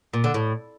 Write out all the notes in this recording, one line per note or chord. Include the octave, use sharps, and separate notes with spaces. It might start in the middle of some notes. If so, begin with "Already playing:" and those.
A#2
D3
A2